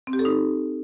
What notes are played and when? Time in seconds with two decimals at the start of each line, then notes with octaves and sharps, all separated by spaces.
0.07 C4
0.13 G4
0.19 A4
0.25 D#4